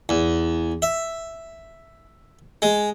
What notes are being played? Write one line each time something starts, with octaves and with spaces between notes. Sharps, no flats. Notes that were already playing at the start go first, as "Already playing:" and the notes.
E2
E5
G#3